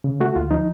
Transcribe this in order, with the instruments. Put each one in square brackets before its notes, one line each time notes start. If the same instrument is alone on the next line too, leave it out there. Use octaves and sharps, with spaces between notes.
[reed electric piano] C#3
A3 F#4
D2 F4
F3 D#4